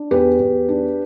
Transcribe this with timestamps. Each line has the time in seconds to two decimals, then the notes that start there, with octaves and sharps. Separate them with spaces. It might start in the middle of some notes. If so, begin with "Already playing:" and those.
Already playing: D4
0.11 E2 G4 B4
0.40 E2
0.69 D4